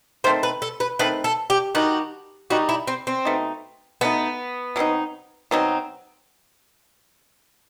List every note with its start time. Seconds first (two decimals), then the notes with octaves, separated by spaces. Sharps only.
0.24 D#3 A3 C4 C5
0.43 B4
0.62 A4
0.80 B4
0.99 D#3 A3 C4 B4
1.24 A4
1.50 G4
1.75 D#3 G3 D#4 F#4 G4
2.50 D#3 G3 D#4 F#4 G4
2.69 E4
2.87 C4
3.07 C4
3.25 B2 A3 D#4
4.01 B2 A3 B3 D#4
4.76 B2 F#3 C4 D#4
5.51 B2 F#3 C4 D#4